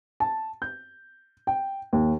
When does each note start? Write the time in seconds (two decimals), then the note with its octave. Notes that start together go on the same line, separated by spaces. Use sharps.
0.20 A5
0.62 G6
1.47 G5
1.93 D#2